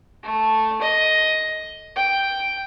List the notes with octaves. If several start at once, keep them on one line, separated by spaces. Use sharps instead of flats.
A3
D#5
G5